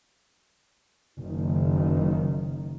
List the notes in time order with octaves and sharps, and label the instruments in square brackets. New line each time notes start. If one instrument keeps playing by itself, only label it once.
[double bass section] F#1 D#3